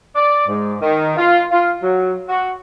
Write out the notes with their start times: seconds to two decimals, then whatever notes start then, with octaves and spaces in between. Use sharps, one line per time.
0.15 D5
0.47 G#2
0.81 D#3
1.17 F4
1.51 F4
1.82 F#3
2.29 F#4